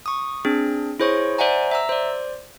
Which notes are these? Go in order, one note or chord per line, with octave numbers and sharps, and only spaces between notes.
C#6 D#6
C4 D4 G#4
E4 G#4 C5 C#5 C#6
C5 D5 E5 F#5 G#5 A#5
E5 A#5 E6
C5 D5